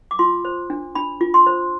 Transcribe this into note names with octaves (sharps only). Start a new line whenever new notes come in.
D6
F4 C6
C5
D4
D4 B5
F4
C6
C5